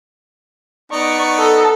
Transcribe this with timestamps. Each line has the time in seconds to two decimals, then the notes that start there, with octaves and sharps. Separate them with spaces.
0.92 B3 D#4 D5 C#6
1.39 A4